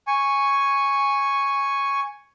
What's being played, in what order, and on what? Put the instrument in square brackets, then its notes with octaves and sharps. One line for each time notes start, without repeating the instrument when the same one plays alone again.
[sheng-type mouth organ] G#5 C#6